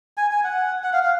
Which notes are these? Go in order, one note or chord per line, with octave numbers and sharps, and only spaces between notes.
G#5
G#5
F#5
F#5
F5
F5